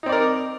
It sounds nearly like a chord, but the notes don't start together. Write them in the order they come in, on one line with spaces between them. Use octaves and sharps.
D#4 C4 D5 A#4